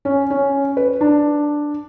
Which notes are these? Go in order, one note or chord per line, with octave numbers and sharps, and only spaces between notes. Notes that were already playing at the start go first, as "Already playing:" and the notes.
C#4
C#4
B4
D4